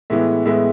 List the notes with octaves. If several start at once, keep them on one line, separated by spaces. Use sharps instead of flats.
A2 E3 G#3 B3 E5
A2 E3 G#3 B3 E5